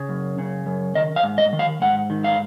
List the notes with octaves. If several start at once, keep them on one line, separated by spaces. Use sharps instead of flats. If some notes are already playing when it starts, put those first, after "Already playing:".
Already playing: C#3
F#2
C#3
F#2
D#3 D#5
F5
G#2
D#5
D#3
F5
G#2 F#5
D#3
F5